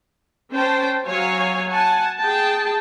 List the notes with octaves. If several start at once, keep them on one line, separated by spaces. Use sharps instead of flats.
C#4 C5 G5 A5
F#3 C#5 F5 G#5
F#5 G#5 A5
G#4 G5 A5